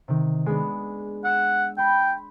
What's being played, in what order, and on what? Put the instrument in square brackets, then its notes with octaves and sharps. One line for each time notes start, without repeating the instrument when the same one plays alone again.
[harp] C3 D#3
G#3 B3 D4
[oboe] F#5 [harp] E6 C#7 E7
[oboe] G5 [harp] B5 C6 G6